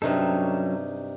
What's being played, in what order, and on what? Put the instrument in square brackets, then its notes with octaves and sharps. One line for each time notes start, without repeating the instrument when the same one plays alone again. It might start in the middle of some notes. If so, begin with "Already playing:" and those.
[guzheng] G2 C3 D#4 [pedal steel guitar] F#3 C#4 A4